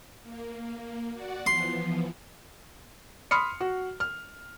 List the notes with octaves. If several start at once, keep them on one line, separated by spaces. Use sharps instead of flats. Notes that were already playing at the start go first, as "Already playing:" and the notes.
A#3
F#4 D5 F#5
E3 F3 B3 C6
B5 C6 D#6 F6 C7 C#7
F#4
F6